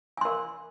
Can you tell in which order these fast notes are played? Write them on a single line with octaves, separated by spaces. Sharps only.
G#5 C6 A#4